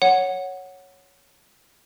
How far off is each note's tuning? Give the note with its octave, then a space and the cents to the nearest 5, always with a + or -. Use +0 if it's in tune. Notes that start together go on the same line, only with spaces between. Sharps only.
C#5 +0 F#5 +0